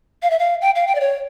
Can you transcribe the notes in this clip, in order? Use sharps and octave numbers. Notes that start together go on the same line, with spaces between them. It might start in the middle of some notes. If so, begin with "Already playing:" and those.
F5
E5
F5
G5
F5
G5
D5
C#5